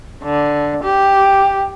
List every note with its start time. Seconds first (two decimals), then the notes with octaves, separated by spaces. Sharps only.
0.23 D3
0.83 G4